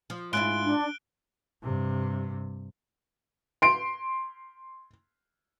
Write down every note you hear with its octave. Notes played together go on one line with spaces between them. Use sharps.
F3
G#2 C#4 E4 F4 F#6 D7 G7
D4
G2 C3
C6 D7